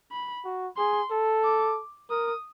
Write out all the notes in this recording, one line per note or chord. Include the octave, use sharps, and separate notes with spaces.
B5
F#4
G#4 C6
A4
D6
A#4 D#6